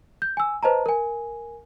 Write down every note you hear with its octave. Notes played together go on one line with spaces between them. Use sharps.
G6
G#5 E6
B4 C5 D#5 A5 A#5
A#4 G#5